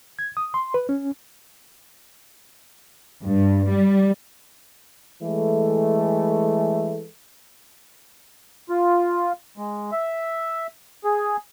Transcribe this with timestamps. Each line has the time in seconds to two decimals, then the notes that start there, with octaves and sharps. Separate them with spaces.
0.19 G#6
0.37 D#6
0.54 C6
0.74 B4
0.89 C#4
3.24 G2
3.68 G3
5.22 E3 G#3 A3
8.69 F4
9.57 G#3
9.92 E5
11.04 G#4